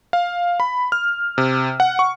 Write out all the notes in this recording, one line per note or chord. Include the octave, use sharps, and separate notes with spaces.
F5
B5
F6
C3
F#5
C#6